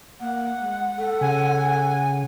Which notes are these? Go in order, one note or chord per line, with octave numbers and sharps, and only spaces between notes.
A#3 F#5
G#3
A4
C#3 G#5